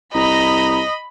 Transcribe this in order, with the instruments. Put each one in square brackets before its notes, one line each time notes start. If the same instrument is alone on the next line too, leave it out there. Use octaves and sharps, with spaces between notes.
[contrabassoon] C2 [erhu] D#5 [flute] A#5 [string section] B5